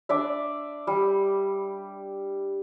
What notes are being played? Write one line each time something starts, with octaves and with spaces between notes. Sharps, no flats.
D4 D5 E5
G3